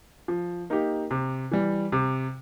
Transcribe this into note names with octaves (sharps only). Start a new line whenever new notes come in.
F3
A#3 D#4 G4
C3
E3 G3
C3